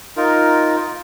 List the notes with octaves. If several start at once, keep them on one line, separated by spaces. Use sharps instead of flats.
D#4 F4 A#4